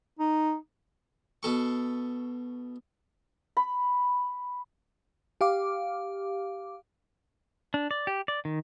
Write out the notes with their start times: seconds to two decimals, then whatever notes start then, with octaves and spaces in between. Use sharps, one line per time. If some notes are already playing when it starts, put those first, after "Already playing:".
0.19 D#4
1.43 B2 A4 C#6
3.57 B5
5.41 G4 F5 D6
7.74 D4
7.91 D5
8.07 G4
8.28 D5
8.45 D#3